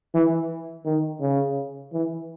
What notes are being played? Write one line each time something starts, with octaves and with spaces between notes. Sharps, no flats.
E3
D#3
C#3
E3